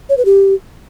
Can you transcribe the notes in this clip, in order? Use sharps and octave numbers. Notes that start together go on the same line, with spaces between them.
C#5
B4
G4